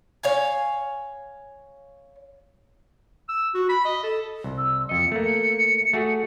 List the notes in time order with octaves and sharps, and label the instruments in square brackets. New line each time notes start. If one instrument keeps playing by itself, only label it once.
[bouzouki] C#5 F5 G#5
[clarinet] E6
F#4
B5
D#5
A4
[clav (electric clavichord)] C2
[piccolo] E6
[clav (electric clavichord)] F2 D#5 [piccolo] C#7
[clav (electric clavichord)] A3 A#3
A3 F#4 G#4